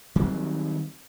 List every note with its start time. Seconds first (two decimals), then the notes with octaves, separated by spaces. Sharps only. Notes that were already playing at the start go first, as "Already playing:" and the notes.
0.16 D#3 F#3 G3 C4